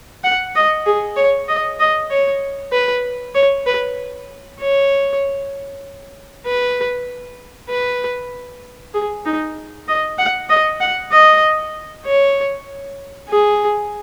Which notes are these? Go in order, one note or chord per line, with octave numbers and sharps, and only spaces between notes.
F#5
D#5
G#4
C#5
D#5
D#5
C#5
B4
C#5
B4
C#5
B4
B4
G#4
D#4
D#5
F#5
D#5
F#5
D#5
C#5
G#4